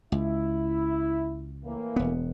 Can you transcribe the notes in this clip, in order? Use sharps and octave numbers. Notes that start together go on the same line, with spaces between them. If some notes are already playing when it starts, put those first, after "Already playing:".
C#2 E4
A2 E3 A#3
E1 B3